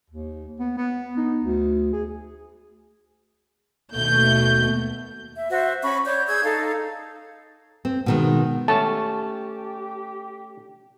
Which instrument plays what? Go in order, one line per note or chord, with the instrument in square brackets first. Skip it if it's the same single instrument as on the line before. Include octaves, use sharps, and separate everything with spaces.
[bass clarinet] D#2
B3
B3
D#4
D2
G#4
[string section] D#2 B2 A3 G6
[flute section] E5
F#4 C5 E5
C#4 B5 C#6
C#5 D5 G6
G#4 E6 G6 G#6
D#4 A4 F5
[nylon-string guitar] C4
B2 D#3 G#3
[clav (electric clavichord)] A3 C#4 [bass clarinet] G4 [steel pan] A5